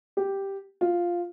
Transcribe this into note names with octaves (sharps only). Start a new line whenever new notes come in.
G4
F4